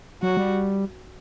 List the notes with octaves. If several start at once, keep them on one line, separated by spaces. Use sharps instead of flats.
F#3 F#4
G3